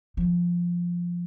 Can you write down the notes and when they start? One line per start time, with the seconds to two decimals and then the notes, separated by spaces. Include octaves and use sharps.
0.17 F3